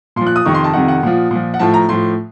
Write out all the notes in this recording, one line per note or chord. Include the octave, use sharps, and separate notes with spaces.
A#2 F3 C6
F#6
D#6
F2 C3 D#3 C#6
C6
A5
F2 C3 D#3 F#5
F#5
A#2 F3
A#2 F3
F#5
A2 F3 A5
A#5
A2 F3 C6